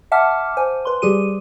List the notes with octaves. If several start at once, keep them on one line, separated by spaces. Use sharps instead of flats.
E5 F#5 A5 D6 F6
C5 G#5
B4 C6
G3 G4 G#4 D#7